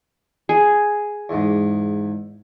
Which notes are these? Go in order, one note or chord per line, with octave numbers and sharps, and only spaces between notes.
G#4
E2 G#2